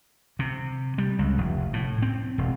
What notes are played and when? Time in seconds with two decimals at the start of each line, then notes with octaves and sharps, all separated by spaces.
0.39 C3
0.98 G3
1.19 C#2
1.38 F1
1.73 A2
2.02 C4
2.38 E1